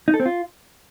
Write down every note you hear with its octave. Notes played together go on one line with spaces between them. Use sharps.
D#4
A4
C4
F4